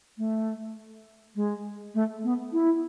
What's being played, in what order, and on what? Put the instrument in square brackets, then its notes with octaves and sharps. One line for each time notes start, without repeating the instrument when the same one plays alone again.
[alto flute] A3
G#3
A3
B3
E4